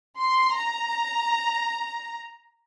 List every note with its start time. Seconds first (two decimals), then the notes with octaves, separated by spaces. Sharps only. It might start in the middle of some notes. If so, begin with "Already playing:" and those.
0.19 C6
0.60 A#5